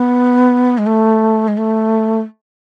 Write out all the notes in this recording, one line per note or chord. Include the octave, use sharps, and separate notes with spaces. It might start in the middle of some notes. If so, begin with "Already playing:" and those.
Already playing: B3
G#3
A3
G#3
A3